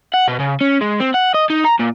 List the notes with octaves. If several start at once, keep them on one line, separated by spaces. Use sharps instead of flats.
F#5
B2
C#3
C#4
G#3
C4
F#5
D#5
D#4
A#5
A#2